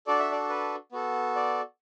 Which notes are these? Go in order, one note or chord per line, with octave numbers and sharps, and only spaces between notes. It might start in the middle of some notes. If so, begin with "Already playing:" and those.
D4 F#4 A4 D5
E5
D5
B4
B3 F#4 A4
D5